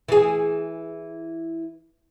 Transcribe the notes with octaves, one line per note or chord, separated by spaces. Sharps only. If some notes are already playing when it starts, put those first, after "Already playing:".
E3 G#4